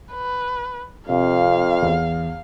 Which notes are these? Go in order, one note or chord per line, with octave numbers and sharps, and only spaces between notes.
B4
F2 C3 F5
E2